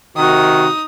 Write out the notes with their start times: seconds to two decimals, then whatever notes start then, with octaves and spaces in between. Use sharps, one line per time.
0.17 C3 D#3 D#4 F#4 D#6